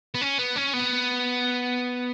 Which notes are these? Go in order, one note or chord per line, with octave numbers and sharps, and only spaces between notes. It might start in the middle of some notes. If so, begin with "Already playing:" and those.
B3
C#4
B3
C#4
B3